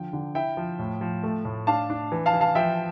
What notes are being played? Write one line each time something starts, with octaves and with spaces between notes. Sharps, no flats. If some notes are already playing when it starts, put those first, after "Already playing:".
Already playing: D3 F3 G5
D3
E4 E5 G5
F3
A2
F3
A3
A2
D4 F5 A5
D4
E3
F5 A5
E3
F5 A5
F3 E5 G5